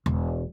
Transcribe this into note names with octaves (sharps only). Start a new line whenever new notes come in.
E1